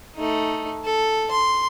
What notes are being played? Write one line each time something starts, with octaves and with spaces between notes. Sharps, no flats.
A3 D#4
A4
C6